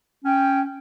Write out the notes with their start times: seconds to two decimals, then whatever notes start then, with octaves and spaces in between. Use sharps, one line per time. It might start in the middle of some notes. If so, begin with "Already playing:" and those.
0.24 C#4 G5